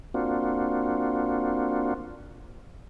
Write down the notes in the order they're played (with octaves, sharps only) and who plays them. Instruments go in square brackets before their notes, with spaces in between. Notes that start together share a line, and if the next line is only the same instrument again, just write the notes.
[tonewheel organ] A#3 C4 D4 F4 F#4